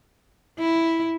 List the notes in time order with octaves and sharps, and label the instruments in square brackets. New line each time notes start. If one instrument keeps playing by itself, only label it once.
[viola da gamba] E4